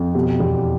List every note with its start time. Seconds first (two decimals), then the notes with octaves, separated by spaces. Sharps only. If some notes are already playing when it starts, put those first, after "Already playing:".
Already playing: F2
0.15 B2 G4
0.40 E2 G4